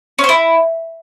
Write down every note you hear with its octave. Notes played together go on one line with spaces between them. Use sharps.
C#4
C5
E4